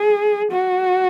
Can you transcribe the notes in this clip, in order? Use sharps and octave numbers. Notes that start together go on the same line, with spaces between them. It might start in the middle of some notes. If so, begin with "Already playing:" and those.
Already playing: G#4
F#4